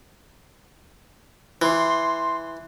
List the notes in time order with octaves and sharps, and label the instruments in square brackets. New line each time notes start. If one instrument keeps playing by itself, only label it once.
[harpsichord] E3 [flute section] C6